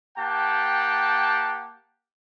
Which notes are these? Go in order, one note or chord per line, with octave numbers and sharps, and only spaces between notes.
A#3 G4 F#5 G5 A5